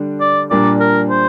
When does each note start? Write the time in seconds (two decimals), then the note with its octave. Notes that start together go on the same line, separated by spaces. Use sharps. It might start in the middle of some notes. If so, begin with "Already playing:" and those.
Already playing: D3 G3 D4
0.21 D5
0.51 A#2 G3 A#3 D4 D5
0.80 A#4
1.10 C5